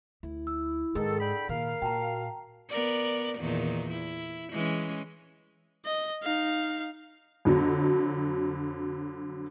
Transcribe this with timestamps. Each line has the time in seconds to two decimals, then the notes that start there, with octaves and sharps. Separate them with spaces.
0.23 D2 E4
0.47 E6
0.95 G#2 D#3 G#4 A4
1.20 D3 G5 B5
1.49 A#2 D#3 A#4 F5
1.82 A#2 F#4 G5 A5 A#5
2.70 B3 A#4 D5
3.39 E2 A#2 D#3
3.93 E4
4.51 E3 G#3 C#4
5.85 D#5
6.23 D#4 F5
7.45 F2 D3 F#3